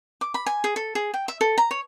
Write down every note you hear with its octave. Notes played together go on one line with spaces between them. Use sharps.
D6
B5
G#5
G#4
A4
G#4
G5
E5
A4
A#5
C#5